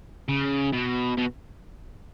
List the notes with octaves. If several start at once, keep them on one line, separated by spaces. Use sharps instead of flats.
C#3
B2
B2